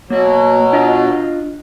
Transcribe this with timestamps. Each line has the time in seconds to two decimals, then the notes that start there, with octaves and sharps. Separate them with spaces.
0.10 B2 F#3 A#3 F#4
0.73 D4 F4 D#5